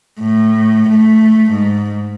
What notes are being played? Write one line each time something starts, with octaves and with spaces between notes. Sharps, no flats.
A2
A3
G#2